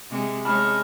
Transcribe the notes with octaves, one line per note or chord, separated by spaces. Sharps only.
C3 G#3
G#3 C#4 A5 B5 F6